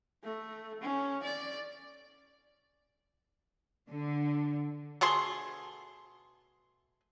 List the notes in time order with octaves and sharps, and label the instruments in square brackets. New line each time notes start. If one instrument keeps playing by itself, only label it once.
[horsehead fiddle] A3
C#4
D5
[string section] D3
[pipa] B2 A3 G#4 C6